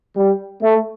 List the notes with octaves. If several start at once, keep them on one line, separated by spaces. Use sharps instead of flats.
G3
A3